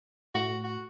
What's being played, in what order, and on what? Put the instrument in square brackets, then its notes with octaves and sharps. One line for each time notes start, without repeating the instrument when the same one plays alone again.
[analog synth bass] A2 [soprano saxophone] F#4
[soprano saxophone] F#4